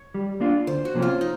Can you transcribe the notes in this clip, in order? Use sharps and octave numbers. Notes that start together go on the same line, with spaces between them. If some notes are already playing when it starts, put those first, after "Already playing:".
Already playing: C#5
G3
A#3 D4 F4
D2 C5
F#4
C3 F3 A#3 C#4
F4
D#4